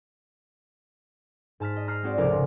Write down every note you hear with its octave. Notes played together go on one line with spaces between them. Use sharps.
G#2 A5 F6 B6
D#5
A#5 F6 F#6 A#6 C7
G#3 C4 F#4 D5
F1 C#2 F4 A#4 D6 D7
C#3